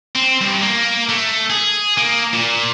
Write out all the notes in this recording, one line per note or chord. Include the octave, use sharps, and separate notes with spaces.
C4
G2
A#3
A3
G#4
A#3
A#2